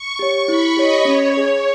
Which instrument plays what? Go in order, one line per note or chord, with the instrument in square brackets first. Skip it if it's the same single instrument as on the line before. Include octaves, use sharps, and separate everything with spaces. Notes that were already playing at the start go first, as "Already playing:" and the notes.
Already playing: [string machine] C#6
[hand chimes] G4 C#5
[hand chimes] E4 [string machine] B5
[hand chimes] G4 C#5 [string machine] D#5
[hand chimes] C#4 [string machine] C#5
[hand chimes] G#4 C#5